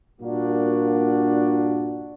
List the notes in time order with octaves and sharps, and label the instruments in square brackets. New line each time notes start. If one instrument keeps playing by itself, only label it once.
[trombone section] G2 A#2 A#3 D4 F#4